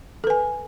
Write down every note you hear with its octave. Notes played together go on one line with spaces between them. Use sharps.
A4 B4 G#5